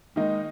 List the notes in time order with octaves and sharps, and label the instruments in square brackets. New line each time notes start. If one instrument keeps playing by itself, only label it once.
[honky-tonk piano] D#3 A#3 D#4 [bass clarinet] G#3